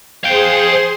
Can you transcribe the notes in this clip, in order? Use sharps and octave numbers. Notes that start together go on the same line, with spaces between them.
G#4 C5 F5 G5 C6